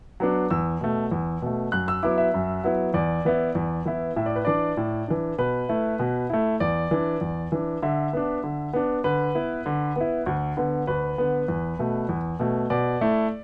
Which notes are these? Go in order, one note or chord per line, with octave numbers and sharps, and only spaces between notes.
F#3 B3 D4
E2 E6
B2 A3
E2
B2 A3
F#2 F#6
E6
F#3 B3 E4 D6
E5
F#2
F#3 B3 E4
E2 D5
E3 B3 E4
E2
E3 B3 E4
A2 E5
D5
B4
E3 D4 D5
A2
E3 D4
B2 B4
A3 E4
B2
A3 E4
E2 D5
E3 D4
E2
E3 D4
D3 E5
B3 D4
D3
B3 D4
D3 B4
B3 E4
D3
B3 E4
D2
D3 B3
D2 B4
D3 B3
E2
B2 A3
E2
B2 A3
B2 D5
A3 E4